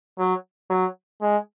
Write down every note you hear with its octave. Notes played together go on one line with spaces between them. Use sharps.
F#3
F#3
G#3